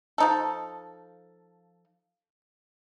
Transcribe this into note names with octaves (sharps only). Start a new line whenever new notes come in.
F3 D#4 A4